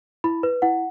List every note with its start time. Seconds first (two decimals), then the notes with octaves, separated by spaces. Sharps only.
0.24 E4 B5
0.43 B4
0.62 E4 F#5